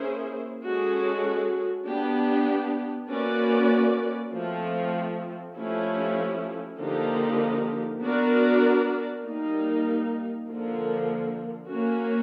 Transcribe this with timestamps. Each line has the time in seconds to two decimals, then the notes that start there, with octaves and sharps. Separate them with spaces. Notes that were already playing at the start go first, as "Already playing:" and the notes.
Already playing: A#3 C#4 E4 G#4 C5
0.65 G#3 C#4 F#4 A4
1.88 B3 D4 G4
3.10 A#3 C#4 F#4 B4 D5
4.34 F3 A3 C4
5.56 F3 A3 C#4 E4 G4
6.79 D3 F3 A#3 D#4 G4
8.02 B3 D4 F#4 A#4 D5
9.25 G3 A#3 D#4
10.47 D3 F3 A#3
11.70 A#3 C#4 F#4